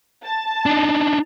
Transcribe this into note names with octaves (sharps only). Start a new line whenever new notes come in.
A5
D4 D#4